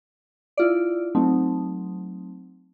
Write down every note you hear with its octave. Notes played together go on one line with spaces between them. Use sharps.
E4 F4 D5
F#3 A3 C4 D#4